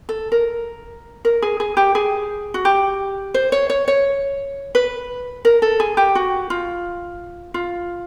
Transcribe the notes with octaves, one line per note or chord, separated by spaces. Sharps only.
A4
A#4
A#4
G#4
G#4
G4
G#4
F#4
G4
C5
C#5
C#5
C#5
B4
A#4
A4
G#4
G4
F#4
F4
F4